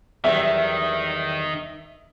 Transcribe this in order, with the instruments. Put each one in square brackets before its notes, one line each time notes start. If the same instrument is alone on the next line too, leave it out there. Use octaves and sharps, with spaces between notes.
[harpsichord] E2 F#3 G3 [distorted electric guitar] D#3 [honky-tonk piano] E5